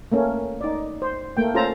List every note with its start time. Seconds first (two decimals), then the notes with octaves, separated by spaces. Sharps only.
0.12 A3 A#3 C#4
0.61 D#4 D5
1.02 C5
1.37 A3 A#3 G5
1.54 C#4 F4 A4 C5 A5 A#5